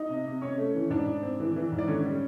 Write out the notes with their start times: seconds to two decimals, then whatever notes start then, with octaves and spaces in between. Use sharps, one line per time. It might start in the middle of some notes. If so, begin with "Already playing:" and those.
Already playing: D#4 D#5
0.09 C3
0.26 C3
0.41 C3 C#4 C#5
0.58 A3
0.75 E3
0.90 G#2 D4 D5
1.07 G#2
1.23 C4
1.40 E3
1.56 E3
1.72 G#2
1.79 D5
1.88 D3 C#4 C#5
2.05 G3